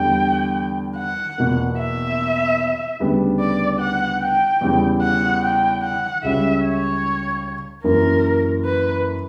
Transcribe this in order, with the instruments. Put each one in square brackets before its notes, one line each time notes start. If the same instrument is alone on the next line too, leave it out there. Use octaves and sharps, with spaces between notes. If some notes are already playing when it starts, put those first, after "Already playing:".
Already playing: [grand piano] E2 D3 G3 [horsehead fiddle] G5
[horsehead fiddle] F#5
[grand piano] E2 B2 A#3
[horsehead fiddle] E5
[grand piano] D2 C#3 G3 B3 D4
[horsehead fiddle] D5
F#5
G5
[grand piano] E2 C#3 E3 G3
[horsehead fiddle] F#5
G5
F#5
[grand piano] C#2 C#3 G3 C#4 [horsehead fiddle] E5
[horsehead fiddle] C#5
[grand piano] F#2 E3 A#3 [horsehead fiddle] A#4
[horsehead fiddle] B4